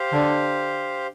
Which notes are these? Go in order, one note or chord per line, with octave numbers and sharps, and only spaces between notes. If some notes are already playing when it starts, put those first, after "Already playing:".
Already playing: G4 C5 F5
D3